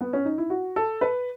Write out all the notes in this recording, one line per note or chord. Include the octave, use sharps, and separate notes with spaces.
B3
C#4
D#4
E4
F#4
A4
B4